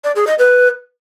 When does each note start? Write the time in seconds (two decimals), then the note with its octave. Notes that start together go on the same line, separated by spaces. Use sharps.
0.04 D5
0.16 G#4
0.27 D#5
0.39 B4